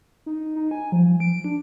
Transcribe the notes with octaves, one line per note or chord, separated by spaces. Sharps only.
D#4
D#4
G#5
F3
D7
D4